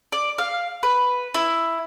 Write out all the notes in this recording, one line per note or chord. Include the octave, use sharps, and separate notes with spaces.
D5
F5
B4
E4